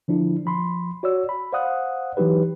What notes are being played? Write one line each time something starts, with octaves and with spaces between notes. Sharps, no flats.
D3 F3 D4 E4
F3 B5 C6
F#4 C#5 D5 E6
B5
C5 D5 F5 F#5 D#6 F#6
E3 F#3 D#4 G4 B4